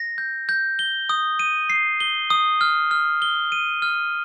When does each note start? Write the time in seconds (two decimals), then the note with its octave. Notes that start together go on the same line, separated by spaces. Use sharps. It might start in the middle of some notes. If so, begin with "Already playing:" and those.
Already playing: A#6
0.18 G6
0.49 G6
0.79 G7
1.09 D#6
1.39 D#7
1.70 C7
2.00 G7
2.30 D#6
2.61 F6
2.91 F6
3.22 G7
3.52 D#7
3.82 F6